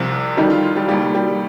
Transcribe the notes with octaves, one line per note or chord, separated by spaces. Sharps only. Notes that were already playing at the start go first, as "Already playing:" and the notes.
Already playing: C2 C3 F3 F4
F2 D#3 G3 D#4
F4
F4
G3 G4
F1 D#2 D#3 G3 G4
G3 G4